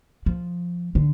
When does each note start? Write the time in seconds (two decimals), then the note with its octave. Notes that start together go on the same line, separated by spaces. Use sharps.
0.26 F3
0.95 D3